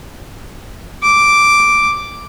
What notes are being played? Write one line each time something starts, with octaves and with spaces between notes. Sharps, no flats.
D6